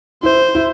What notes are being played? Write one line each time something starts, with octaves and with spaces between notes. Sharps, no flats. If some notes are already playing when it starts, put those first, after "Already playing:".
E4 C5
E4